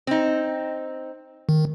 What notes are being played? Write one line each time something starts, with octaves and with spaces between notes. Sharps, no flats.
C4 D#4
D#3